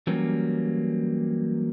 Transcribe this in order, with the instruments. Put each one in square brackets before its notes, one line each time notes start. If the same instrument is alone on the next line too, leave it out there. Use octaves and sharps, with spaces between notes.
[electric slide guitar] E3 F#3 G3 A#3 C#4